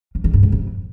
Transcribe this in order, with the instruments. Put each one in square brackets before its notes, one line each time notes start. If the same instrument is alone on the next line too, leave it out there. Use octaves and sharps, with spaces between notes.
[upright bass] F3
D#3
G2
G#2
F2